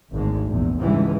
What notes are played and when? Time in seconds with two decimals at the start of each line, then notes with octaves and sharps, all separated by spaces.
0.12 G#1 D2 G#2 G#3
0.49 A#1 E2
0.80 C#2 G#2 D3 E3 G3